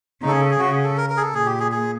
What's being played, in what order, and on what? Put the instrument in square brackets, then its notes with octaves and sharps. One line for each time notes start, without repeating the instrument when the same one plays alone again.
[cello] C#3 [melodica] D#4
[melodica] A4
G#4
A4
G#4
[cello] C#3 [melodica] F#4
[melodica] G#4
A4
A#4
A#4
G#4
A4
[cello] A#2 [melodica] G#4
[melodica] G4
G#4
G#4